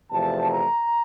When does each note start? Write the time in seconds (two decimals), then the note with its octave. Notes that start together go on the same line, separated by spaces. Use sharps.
0.11 E2 C3 F3 A3 A5
0.49 A#5